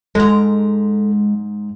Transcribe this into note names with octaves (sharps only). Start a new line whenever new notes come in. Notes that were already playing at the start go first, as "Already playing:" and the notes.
G#2 G#3 A4 A#5